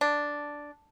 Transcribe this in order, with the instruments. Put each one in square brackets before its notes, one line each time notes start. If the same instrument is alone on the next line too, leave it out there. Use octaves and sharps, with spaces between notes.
[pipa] D4